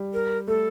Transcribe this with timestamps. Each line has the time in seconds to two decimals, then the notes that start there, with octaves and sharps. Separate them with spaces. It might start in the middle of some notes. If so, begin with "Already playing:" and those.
Already playing: G3
0.13 A#4
0.47 A3 A4